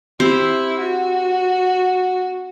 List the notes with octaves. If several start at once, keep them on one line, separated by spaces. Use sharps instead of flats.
C4 E4 G4 C5
F#4